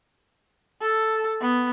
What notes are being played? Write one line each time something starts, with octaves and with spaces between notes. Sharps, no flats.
A4
B3